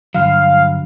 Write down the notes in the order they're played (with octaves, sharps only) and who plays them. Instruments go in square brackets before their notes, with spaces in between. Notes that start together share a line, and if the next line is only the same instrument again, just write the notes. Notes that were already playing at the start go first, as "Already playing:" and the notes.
[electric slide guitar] G2 D3 F#3 [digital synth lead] F5